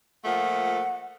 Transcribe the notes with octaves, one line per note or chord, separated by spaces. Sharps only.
A#2 F3 A3 F#5